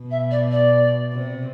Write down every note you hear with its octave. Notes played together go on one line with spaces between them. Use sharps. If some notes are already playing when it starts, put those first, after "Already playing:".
Already playing: B2
E5
D5
D5
C3